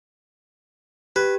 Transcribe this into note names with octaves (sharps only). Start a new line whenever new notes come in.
G4 B4